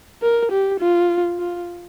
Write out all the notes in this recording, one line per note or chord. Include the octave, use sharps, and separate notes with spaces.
A#4
G4
F4
F4